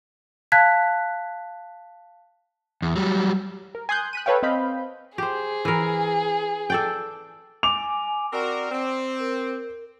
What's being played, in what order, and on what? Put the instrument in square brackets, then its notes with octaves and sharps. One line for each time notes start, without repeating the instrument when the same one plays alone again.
[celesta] F5 A5 F#6 G#6 B6
[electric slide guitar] E2
F#3 G3
[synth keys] A#4
G#5 C6 D#6 F#6 G6
F#6 B6 D#7
A4 B4 C#5 F5 G5
C4 D#5 F5 B5 G6
[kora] G4 C5 [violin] G#4
[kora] E3 A#4
A4 D5 G5
[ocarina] G#5 [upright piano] D6 F7
[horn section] C4 F#4 A#4 [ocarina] D5
[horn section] C4
[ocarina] A#4